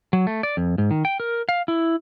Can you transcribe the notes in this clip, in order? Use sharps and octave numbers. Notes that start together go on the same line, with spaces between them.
F#3
A3
D5
F2
G#2
D#3
G5
A#4
F5
E4